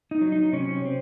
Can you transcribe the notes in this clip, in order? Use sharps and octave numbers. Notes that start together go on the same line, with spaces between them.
D#4
F#3
D#4
C3 C#4
C4